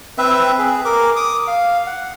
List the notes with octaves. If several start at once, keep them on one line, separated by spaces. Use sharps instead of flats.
C4 B4 E5
G#4
A#4 D6
D6 D#6
F5
F#5